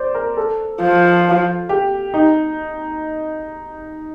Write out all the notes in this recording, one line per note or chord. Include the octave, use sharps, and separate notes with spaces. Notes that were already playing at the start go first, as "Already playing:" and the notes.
Already playing: C5 D5
A#4
A4
F3
G4
D#4